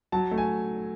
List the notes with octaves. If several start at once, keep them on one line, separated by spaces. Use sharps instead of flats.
F#3 A5
A3
G#5